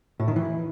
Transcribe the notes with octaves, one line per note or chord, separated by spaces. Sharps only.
A2
D#3
E3